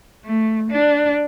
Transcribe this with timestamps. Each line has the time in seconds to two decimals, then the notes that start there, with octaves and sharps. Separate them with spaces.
0.25 A3
0.71 D4